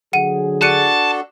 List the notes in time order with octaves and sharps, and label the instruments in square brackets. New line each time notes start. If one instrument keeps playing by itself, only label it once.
[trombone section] D3 F#3 G#4 [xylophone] F#5 D#7
[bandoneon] D4 F#4 A4 [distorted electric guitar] A5 [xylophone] F#6 C#7 D#7